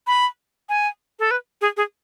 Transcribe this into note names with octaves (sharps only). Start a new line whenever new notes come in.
B5
G#5
A4
B4
G#4
G#4